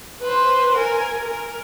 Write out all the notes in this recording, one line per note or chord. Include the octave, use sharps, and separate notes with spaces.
B4 C5
A#4 G#5
A#4